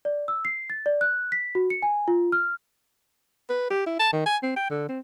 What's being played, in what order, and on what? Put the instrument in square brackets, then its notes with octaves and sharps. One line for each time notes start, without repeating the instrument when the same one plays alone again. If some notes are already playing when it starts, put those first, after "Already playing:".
[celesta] D5
E6
C7
A6
D5
F#6
B6
F#4
C#7
G#5
F4
F6
[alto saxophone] B4
G4
E4
A5
D#3
G#5
C4
G5
D3
C4